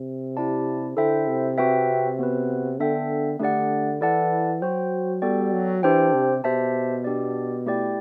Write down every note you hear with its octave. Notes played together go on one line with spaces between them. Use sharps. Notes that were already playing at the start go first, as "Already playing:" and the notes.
Already playing: C3
E4 G4 D5 A5
D3 E4 A4 C5 E5 G5
C3
C4 F#4 B4 E5 G5
B3 F#4 B4
D3 B3 D4 A4 E5 G5
D3 A3 D4 G4 D5 F#5
E3 E4 A4 D5 F#5 A5
F#3 F#4 C5 G5
G3 B3 F#4 A4 D5 G5
F#3
E3 D4 G4 C5 G5
C3
B2 G4 C5 E5 A5
B3 D4 G4 D5
A3 E4 G4 D5 G5